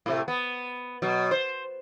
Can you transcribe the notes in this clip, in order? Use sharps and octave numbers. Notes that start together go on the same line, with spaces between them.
A2 C3 A3
B3
B2 F#3
C5